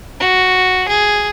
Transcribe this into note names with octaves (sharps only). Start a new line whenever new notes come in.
F#4
G#4